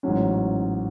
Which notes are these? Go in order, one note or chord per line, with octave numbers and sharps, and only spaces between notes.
A1 G#2 F#3 C#4